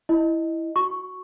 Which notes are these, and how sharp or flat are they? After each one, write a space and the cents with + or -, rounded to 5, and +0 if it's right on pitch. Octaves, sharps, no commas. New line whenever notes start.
E4 +0 D#5 +0
F#4 +0 C#6 +0